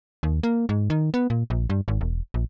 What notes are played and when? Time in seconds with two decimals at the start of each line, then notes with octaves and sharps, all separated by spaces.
0.23 D#2
0.43 A#3
0.69 G#2
0.90 D#3
1.14 B3
1.30 A#2
1.50 A#1
1.70 G2
1.88 G#1
2.01 E1
2.34 A#1